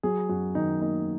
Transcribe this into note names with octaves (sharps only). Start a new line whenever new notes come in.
F#3 G#4
F#2 F#4
D#3 D#4
A#3 D#4